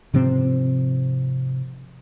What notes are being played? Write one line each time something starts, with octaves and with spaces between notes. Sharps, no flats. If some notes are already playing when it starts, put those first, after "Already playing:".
G#2 C3 F3 C4